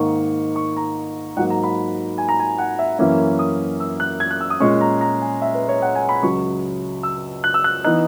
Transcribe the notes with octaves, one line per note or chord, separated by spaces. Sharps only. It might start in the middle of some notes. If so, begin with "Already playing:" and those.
Already playing: G#2 D#3 A#3 D#4 C#6
C#6
A#5
G#2 F#3 A#3 F#5
A#5
B5
G#5
A#5
G#5
F#5
E5
F#2 E3 A#3 C#4 E5
D#6
E6
F#6
G#6
F#6
E6
D#6
A#2 G#3 C#4 C#6
A#5
A#5
G#5
E5
B4
C#5
F#5
G#5
B5
C#2 C#3 F#3 C#6
E6
F#6
E6
F#6
E3 B3 D#4 F#6